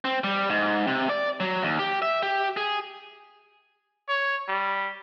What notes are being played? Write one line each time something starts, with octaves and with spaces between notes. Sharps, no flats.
C4
G3
G#2
C3
D5
F#3
D#2
G4
E5
G4
G#4
C#5
G3